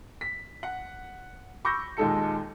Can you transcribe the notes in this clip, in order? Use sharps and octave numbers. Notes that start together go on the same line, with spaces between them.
B6
F#5
B5 C#6 D6 E6 G6 A#6
D#2 A#2 G#3 D#4 A4 C#7